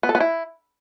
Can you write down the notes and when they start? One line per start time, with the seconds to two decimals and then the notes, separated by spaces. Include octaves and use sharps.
0.03 B3
0.09 A4
0.15 B3
0.20 E4